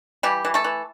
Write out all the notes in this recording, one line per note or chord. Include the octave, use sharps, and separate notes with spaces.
E3 G3 G4
E3
A3 A4
E3